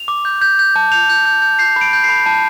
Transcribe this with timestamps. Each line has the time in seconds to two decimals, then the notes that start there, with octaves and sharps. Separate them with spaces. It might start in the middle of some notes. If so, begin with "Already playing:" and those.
Already playing: F7
0.08 D6
0.25 G6
0.42 G6
0.59 G6
0.76 A5
0.92 G6 F7
1.10 G6
1.25 G6
1.42 G6
1.59 G6 C7
1.76 B5
1.81 D7
1.93 G6
2.04 C7
2.09 B5
2.26 A5